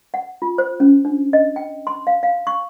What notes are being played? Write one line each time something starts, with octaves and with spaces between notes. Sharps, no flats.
F#5
F4
C5
C#4
D4
D#5
G5
C6
F5
F5
C#6